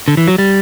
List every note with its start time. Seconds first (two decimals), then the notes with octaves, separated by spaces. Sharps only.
0.08 D3
0.17 E3
0.28 F#3
0.38 G3